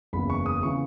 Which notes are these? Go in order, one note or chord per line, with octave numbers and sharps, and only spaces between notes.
F#1 E2 C#3 E3 B3 B5
C#6
D#6
C#3 E3 B3 C#6